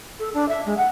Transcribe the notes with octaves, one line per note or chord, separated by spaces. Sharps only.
A4
D4
E5
G#3
F#5